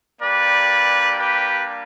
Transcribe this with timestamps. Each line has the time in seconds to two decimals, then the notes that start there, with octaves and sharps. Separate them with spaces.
0.22 G3 A#3 D4 G4 B4 D5
1.18 G4 B4